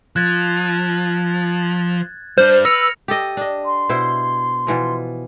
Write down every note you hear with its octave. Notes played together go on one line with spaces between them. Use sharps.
F3 F#6 G#6 A6
G3 D4 C5 F6
B4 E6 A#6 C#7 F7
G4 A4 D#5
D4 D#5
C6
B2 E4 C5
B2 E3 F3